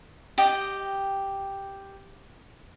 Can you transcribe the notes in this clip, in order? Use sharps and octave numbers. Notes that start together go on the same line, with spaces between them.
G4 D#5 G5